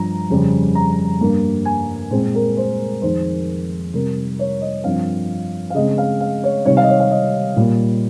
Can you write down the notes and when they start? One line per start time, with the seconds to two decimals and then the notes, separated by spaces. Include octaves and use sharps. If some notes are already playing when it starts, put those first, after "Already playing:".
Already playing: G2 F3 A#5
0.30 F2 C#3 G3
0.75 A#5
1.21 G2 G3 A#3
1.65 G#5
2.11 A#2 G#3 C4 C5
2.35 A#4
2.57 C5
3.02 F2 D#3 G#3 C5
3.93 C3 G3 C4 A#4
4.39 C#5
4.62 D#5
4.84 G2 F3 C4 F5
5.70 F5
5.75 C#3 G#3 C4 D#5
5.98 F5
6.20 F5
6.44 C#5
6.65 C3 D#3 G3 C4 C#5
6.77 F5
6.83 D#5
6.89 C#5
7.00 F5
7.11 D#5
7.57 A#2 G3 A#3